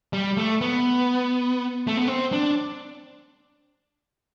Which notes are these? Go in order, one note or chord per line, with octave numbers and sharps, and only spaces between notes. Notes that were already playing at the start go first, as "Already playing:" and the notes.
G3
A3
B3
A3
B3
C4
D4